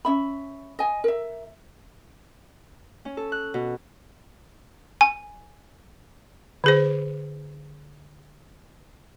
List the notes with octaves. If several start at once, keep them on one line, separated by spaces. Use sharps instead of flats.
C#4 E5 B5
D#5 G#5
A#4 E5
C#4
A4
F#6
B2
G#5
D3 G#4 C5